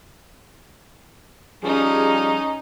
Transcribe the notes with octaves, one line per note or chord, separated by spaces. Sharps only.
F3 G3 C#4 D#4 G#4